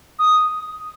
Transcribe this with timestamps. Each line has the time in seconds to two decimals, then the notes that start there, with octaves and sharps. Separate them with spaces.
0.19 D#6